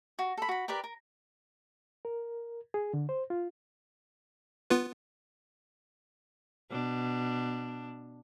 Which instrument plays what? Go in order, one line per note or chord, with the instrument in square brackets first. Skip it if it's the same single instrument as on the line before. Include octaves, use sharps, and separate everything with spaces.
[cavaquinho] F#4
A4 B5
F#4 B5
G4 A#4 B4 D5
A#4
[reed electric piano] A#4
G#4
D3
C5
F4
[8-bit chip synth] B3 F4 B4
[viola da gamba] B2 D4